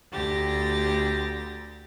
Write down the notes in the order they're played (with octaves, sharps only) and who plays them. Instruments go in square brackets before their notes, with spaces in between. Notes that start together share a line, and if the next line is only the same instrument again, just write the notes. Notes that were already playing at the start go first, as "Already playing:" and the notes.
[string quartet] D2 G4 A6 A#6